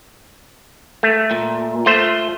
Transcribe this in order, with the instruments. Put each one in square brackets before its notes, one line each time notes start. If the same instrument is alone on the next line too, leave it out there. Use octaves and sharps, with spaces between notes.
[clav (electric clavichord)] A3
[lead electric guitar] A#2
[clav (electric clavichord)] A3 C5 [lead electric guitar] F4 C6